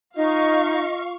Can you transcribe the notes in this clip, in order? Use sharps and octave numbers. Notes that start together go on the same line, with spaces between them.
D#4 F4 D#5 F5 C#6